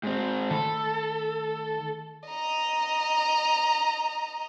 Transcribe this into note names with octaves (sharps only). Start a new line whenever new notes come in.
G#2 C4
D#3 A3 A4 B5
D#5 A#5